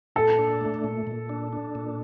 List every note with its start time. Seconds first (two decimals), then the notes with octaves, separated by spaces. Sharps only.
0.16 A#2 A4
0.38 D4
0.61 A3
0.84 A#2
1.07 A#2
1.29 D4
1.53 D4
1.75 A#2